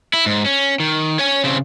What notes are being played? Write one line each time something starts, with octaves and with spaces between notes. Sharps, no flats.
E4
G#2
C#4
D#3
C#5 G#5
C#3 C4